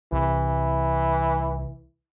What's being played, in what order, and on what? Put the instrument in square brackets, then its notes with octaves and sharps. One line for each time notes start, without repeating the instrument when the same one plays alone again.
[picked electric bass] C2 [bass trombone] E3